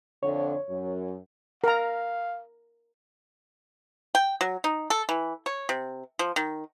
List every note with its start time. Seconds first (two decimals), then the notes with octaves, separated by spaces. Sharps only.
0.23 F2 D3 C#5
0.70 F#2
1.64 A#4 F5 A#5
4.15 G5
4.41 F#3
4.64 D#4
4.90 A4
5.09 E3
5.46 C#5
5.69 C3
6.19 F3
6.36 D#3